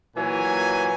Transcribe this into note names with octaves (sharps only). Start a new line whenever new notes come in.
A#2 E3 F#3 G#5